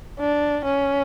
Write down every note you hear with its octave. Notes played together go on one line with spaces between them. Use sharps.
D4
C#4